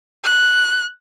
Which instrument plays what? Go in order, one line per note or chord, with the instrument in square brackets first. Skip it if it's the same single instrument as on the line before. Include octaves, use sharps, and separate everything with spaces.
[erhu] F#6